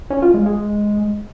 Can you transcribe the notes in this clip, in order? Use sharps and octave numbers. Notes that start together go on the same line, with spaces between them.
C#4
F4
G#3
G#3